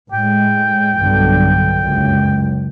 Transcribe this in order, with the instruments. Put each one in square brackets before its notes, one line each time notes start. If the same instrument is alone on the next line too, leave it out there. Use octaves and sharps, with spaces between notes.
[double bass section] A2 G#3 [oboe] G5
[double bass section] B1 G2 D3
F#1 C#2 F#2